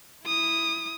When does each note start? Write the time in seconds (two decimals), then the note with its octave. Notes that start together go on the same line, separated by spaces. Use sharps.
0.25 E4 D#6